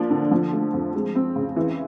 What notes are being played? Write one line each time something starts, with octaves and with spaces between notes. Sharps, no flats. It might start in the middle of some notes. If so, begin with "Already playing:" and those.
Already playing: F3 A#3 D4
D3
F3
A3
F2
G#3
C4
C#3
E3